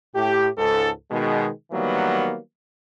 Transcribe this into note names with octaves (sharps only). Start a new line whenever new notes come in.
A2 G4
C#2 G#2 A4
B2 D#3 G#3
D#3 E3 F#3 G3 A#3 B3